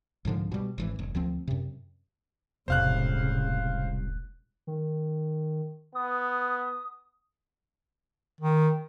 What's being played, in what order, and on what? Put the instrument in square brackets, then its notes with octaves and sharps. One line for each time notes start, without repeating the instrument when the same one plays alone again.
[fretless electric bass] C2 G#2 D3 F3
B2 G3
G#1 D3 E3
F1
D2 F3 C4
F#2 C3
[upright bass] E1 [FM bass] C2 [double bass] A2 C#3 [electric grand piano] C5 F5 F#6
[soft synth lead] D#3
[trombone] B3 [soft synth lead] D#6
[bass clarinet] D#3